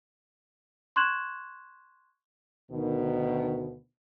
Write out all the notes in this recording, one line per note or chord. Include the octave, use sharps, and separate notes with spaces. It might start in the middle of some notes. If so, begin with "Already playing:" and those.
C6 C#6 F#6 G#6 E7 F#7
D2 B2 D#3